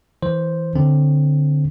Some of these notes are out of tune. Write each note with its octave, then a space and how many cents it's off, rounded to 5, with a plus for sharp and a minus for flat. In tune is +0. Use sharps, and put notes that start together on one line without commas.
E3 -20 C5 +0
D3 +0 C4 +0